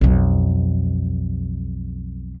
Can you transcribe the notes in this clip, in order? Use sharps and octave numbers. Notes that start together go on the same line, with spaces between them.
B1 F2